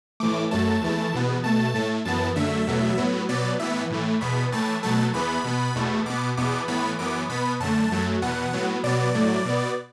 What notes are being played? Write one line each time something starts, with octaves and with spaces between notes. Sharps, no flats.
A2 E3 A3 D6
F#2 F#3 A3 A5
E2 E3 A3
E2 B2 B3
B2 A3 A5
A2 A3
F#2 E3 B3 A5
F#2 D3 A3 E5
E2 B2 F#3 A3
A2 F#3 B3
B2 F#3 B3 D5
A2 E3 B3 E5
A2 E3 A3
E2 B2 B3 B5
A2 E3 A3 A5
B2 F#3 A3 A5
E2 E3 B3 B5
B2 B3
E2 B2 A3
B2 B3 D6
E2 B2 B3 D6
A2 E3 B3 B5
F#2 E3 B3 D6
B2 B3 B5
F#2 D3 A3 A5
F#2 F#3 A3
E2 B2 B3 F#5
A2 F#3 B3
B2 F#3 B3 D5
A2 F#3 A3
B2 B3